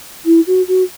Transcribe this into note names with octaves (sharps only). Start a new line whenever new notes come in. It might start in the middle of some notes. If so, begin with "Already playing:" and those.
E4
F#4
F#4